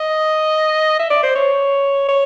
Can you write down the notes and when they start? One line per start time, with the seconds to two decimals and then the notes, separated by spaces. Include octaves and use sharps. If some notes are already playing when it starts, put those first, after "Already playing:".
Already playing: D#5
0.99 E5
1.10 D5
1.23 C5
1.35 C#5
2.09 C#5